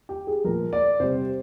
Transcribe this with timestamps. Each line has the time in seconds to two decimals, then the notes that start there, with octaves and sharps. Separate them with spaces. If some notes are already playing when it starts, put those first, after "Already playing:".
0.09 G4
0.27 G#4
0.44 A#2 F3 A#4
0.73 D5
1.00 C3 G3 C5